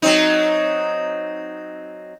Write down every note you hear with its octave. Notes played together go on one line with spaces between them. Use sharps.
F#3 C4 D#4